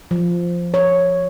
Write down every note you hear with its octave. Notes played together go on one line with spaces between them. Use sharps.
F3
C#5